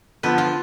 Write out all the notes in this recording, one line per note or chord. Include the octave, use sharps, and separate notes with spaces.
D3 F3 B3 B4
F4